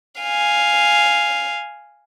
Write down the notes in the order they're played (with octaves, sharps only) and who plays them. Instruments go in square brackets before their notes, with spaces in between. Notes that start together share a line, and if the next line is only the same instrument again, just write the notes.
[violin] F5 G#5